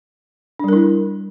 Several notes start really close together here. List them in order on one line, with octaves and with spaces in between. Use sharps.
D4 G3 A#4 E4